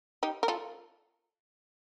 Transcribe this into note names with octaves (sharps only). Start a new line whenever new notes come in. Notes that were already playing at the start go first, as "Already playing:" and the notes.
D#4 G4
A#4
F4 A4